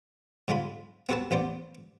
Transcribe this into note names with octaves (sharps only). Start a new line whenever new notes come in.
G#2 D3 G#3 F4 B5
B3 C4 F#4 A4 B4 A5
A1 B3 C5 D5